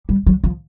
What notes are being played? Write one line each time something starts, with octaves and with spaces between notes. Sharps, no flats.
G3
F#3
F3